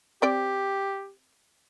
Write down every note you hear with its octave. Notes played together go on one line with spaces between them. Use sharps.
C4 G4 D5 G5